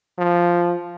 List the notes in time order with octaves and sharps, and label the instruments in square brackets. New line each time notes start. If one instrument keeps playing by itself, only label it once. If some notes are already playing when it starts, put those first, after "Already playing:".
[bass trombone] F3